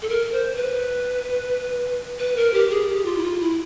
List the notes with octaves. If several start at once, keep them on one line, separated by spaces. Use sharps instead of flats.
A4
A#4
C5
B4
B4
A#4
G4
G#4
G4
F4
E4
F4
E4